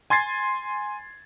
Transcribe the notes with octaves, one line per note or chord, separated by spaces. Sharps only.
G#5 C6 G#6 A6 C7